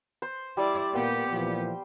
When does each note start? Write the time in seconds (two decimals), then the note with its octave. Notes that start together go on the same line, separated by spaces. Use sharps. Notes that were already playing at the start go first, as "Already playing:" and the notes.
0.22 C5
0.57 G3 E4 D5
0.94 A#2 A#3 B3 G4 C5 G5
1.31 A#2 E3 F3